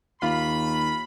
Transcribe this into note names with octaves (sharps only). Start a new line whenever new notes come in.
D#2 F4 B5